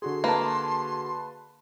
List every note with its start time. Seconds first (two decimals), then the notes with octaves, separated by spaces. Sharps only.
0.02 D3 F#4 G#4 C6
0.24 A#3 B4 A5